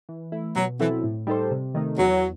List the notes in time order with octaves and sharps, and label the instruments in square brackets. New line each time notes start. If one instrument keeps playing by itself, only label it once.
[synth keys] E3
A3 E4
[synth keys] B2 [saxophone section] F#3
[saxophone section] E3 [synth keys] F#3 C4 E4 A4
[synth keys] A2
G3 D#4 A4 C5
C3
D#3 A3 D#4
[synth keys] E2 [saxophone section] F#3